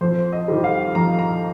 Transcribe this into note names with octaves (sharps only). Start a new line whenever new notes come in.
F2 C5
D#5
D#3 G3
F5
F2 A#5
A#5